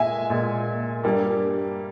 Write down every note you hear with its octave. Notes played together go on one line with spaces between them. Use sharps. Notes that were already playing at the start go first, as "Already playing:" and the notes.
Already playing: A#2 G#3 E5 G#5
A#2 G#3
G2 G3 A#3